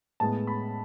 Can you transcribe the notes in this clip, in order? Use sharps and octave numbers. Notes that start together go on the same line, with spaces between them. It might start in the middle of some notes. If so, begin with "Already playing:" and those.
A2 G#3 B3 A5
B5